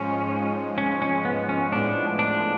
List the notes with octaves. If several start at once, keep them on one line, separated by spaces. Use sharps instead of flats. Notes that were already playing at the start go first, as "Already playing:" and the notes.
Already playing: G#2 F3 G#3 C#4
C#4
C#4
B3
C#4
A2 F3 G#3 B3 D4
D4